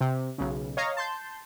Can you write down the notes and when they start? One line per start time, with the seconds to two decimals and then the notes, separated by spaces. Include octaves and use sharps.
0.01 C3
0.38 B1 C#3
0.77 C#5 D#5 F5 A#5
0.97 A5 C6 G6